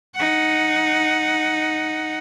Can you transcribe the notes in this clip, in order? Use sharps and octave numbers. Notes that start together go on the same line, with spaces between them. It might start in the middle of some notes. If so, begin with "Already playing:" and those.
D#4 F#5